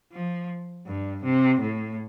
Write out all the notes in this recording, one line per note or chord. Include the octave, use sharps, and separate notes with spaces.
F3
G2
C3
A2